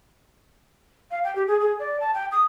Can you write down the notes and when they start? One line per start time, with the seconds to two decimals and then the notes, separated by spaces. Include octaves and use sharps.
1.11 F5
1.24 G5
1.36 G4
1.48 G#4
1.60 G#4
1.79 D5
2.00 A5
2.14 G5
2.32 D#6